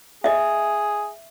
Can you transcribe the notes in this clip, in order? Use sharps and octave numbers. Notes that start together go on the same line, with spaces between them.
G#4 D#5 E5